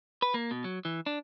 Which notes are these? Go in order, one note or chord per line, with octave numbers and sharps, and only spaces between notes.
B4
A#3
B2
F#3
E3
D4